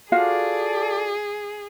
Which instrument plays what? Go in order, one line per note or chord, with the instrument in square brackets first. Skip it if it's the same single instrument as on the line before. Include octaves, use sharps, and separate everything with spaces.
[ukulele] F4 F#4 F5 [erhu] G#4 [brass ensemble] A4 D5